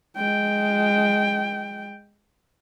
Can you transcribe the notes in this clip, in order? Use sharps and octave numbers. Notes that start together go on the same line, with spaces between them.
G#3 G5